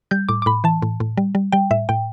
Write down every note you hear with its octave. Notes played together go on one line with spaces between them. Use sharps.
G3 G6
A2 D6
D6
A2 B5
E3 A5
A2
A2
G3
G3
G3 G5
A2 E5
A2 G5